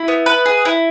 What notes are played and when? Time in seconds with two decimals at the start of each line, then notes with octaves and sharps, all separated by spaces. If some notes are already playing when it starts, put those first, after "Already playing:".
Already playing: E4
0.08 B3
0.26 B4
0.46 G#4
0.65 E4